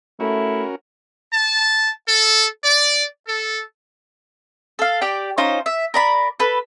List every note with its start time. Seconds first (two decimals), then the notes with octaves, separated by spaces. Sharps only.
0.20 A3 C#4 E4 F#4 A#4
1.32 A5
2.08 A4
2.64 D5
3.27 A4
4.79 A4 F5
5.01 G4 D5 G5
5.38 C#4 D#4 F4 C5
5.66 E5
5.94 A#4 D5 B5
6.40 A4 B4